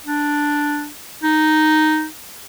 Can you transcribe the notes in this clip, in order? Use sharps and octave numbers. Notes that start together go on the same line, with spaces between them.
D4
D#4